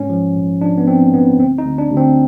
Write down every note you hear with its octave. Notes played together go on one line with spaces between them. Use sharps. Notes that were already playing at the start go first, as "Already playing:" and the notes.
Already playing: G#2 C#4
F3
A#1
F3 D4
B3
F3 C4
A#1 B3
D2 C4
D#4
D2
D4
D2
C4